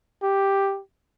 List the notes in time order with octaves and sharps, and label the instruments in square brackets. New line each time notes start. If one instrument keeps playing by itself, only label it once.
[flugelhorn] G4